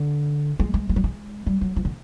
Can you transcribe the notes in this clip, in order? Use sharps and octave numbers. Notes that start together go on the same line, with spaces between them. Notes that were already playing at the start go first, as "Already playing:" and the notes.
Already playing: D3
G#3
G#3
G#3
G3
G#3
G3
F#3
F3
D3